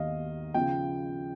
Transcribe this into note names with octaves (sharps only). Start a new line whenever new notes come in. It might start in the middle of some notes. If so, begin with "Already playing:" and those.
Already playing: D#2 D#3 D#5 F5
C#3 F3 G5